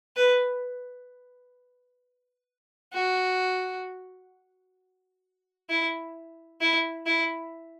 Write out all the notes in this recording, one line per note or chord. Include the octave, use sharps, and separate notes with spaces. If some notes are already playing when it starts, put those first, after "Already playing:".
B4
F#4
E4
E4
E4